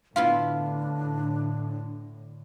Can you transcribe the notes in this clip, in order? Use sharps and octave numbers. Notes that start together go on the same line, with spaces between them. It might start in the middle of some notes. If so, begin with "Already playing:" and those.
A2 D3 B3 D4 E4 F4 F5